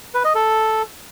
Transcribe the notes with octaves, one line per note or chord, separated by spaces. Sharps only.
B4
D#5
A4